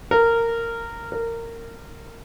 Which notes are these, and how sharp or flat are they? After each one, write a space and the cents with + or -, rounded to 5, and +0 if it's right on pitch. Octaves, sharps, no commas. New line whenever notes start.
A#4 -15
A#4 -20